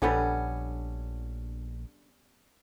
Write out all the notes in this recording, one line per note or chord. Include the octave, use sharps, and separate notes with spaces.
A#1 G3 B3 C#4 D4 A4 F#5